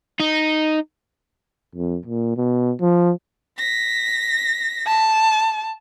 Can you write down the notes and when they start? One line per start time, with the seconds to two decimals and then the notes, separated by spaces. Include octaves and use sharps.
0.20 D#4
1.75 F2
2.06 A#2
2.37 B2
2.81 F3
3.58 A#6 B6
4.87 A5